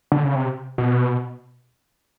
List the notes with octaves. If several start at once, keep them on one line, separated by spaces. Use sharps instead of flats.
D3
C#3
C3
B2